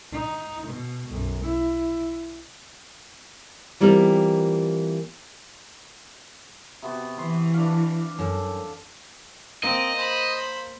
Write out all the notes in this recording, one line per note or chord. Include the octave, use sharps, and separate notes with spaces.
D#4
B2
B1 F#2
E4
E3 G3 A#3 C4 F4 A#4
C3 B3 F#4
E3 C6
D4 F5
F#2 A4
A#3 C4 D#5
C5 B5